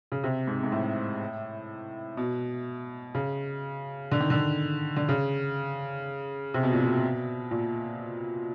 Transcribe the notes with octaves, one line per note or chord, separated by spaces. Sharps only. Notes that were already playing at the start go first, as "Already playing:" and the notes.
C#3
C3
G#2
G#2
A2
B2
C#3
D3
D#3
D3
D3
C#3
C3
B2
A#2
B2
A#2